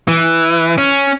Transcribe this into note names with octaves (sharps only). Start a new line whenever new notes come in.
E3
C#4